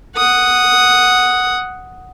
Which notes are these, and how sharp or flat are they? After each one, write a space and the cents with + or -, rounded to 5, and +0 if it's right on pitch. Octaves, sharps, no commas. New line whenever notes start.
F#5 +0 D#6 +0